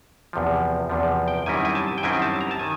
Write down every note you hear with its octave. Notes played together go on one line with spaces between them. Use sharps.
E2 C3 F3
E2 C3 F3
G5
F#2 D#3 G3 C4 E4 G#5
G#5
A5
G5
F#2 D#3 G3 C4 E4 G#5
A5
A#5
A5
D#3 G#5